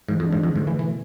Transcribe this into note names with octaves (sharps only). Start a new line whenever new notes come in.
G#2 E3
F2
D4
G#2
F2 D3
G#2
A3
E3
B2 E3